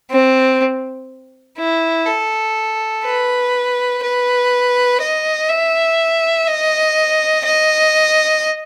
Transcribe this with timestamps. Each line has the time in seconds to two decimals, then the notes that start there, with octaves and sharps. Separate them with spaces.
0.11 C4
1.58 E4
2.07 A4
3.04 B4
4.03 B4
5.01 D#5
5.49 E5
6.48 D#5
7.45 D#5